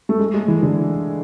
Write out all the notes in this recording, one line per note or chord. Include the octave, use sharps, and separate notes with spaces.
A3
G#3
G#3
E3
D3